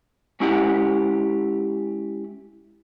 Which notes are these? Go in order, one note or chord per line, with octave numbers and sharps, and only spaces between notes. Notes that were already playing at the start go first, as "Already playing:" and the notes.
G#3 C#4 E4 G4 F#5